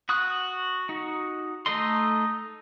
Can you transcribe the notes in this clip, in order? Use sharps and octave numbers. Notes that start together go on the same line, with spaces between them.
F#4 C#6 D#6 F#6
D#4 F#4
A3 D#4 A4 D#5 C6